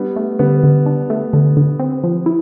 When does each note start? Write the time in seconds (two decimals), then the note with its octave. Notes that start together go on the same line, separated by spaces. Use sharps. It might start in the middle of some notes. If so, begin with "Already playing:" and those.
Already playing: G3 B3 D4
0.16 A3
0.39 D3 G3 B3
0.64 D3
0.86 D4
1.10 A3
1.33 D3
1.57 D3
1.79 C4
2.04 F3
2.26 E4